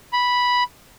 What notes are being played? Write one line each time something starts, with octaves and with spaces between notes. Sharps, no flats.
B5